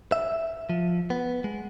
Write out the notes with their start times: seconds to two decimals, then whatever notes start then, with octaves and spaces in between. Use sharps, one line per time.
0.12 E5
0.69 F3
1.10 B3
1.44 G#3